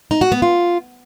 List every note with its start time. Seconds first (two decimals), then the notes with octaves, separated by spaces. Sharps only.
0.11 D#4
0.21 F#4
0.32 B3
0.42 F4